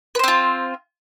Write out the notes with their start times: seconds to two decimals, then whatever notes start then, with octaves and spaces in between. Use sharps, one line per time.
0.15 B4
0.19 C5
0.24 C4
0.28 F4